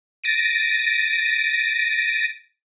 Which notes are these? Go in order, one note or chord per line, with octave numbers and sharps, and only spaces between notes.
A6 A#6 D7 D#7